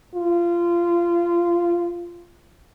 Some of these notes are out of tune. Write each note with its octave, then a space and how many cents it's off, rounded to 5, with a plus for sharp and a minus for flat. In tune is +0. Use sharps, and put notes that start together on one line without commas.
F4 -20